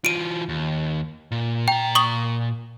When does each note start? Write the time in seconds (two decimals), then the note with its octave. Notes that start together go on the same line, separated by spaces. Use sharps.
0.05 E3 F4 D7 D#7
0.49 D#2
1.32 A#2
1.68 A#2 G5 A#5
1.95 C#6 D#6 F#7